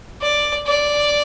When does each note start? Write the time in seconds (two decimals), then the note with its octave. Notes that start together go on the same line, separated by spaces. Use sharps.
0.22 D5
0.67 D5